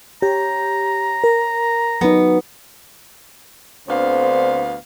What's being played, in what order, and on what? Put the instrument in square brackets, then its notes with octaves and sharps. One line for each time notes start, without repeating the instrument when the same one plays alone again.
[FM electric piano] G4 [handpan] C#5 [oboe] A#5
[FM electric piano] A#4
[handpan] F#3 D#4 [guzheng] B3
[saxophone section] D2 B3 F5 [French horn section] D3 C4 C5